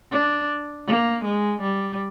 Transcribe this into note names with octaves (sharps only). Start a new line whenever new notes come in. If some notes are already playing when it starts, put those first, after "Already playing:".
D4
A#3
G#3
G3